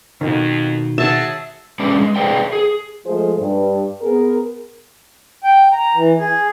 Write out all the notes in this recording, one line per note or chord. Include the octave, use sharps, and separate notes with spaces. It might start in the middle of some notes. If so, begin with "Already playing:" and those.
F2 B2 D#3
F#3 G#4 E5 A5
G#3 C#4 B4 D5
G#3
G#4 B4 C5 D5 G5
G#4
F3 G#3 A3 F4 G#4 C5
G2
B3 G#4 A#4
G5
A#5
E3
G#4